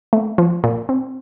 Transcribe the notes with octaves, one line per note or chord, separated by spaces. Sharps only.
A3
F3
A#2
C4